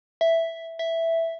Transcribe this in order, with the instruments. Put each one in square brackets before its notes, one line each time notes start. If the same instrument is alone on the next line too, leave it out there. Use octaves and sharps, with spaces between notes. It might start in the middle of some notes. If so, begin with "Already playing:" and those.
[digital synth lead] E5
E5